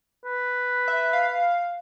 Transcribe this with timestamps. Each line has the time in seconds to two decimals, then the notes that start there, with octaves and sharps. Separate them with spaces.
0.25 B4
0.88 E5
1.13 F5